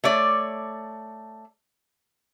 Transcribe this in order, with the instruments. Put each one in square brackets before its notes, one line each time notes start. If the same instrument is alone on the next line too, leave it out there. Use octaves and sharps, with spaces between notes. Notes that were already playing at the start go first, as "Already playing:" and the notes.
[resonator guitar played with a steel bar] A3 C#5 D5